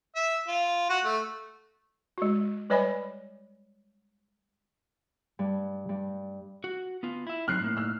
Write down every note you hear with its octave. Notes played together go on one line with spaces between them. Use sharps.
E5
F4
F#4
A3
G#3 F#4
G3 B4 C#5 D#5 G#5 B5
G2
G2
F#4
B3 F4
E4 E5
F#3 C4 F6 F#6 C7
A2 A#3
E6 F6